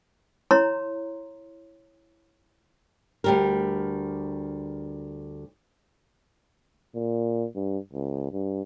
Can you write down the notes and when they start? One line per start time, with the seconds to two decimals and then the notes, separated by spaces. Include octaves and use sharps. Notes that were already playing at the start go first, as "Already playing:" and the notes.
0.51 E4 C#5 A#5 C6
3.24 D2 G3 A#4
6.95 A#2
7.55 G2
7.93 C#2
8.32 G2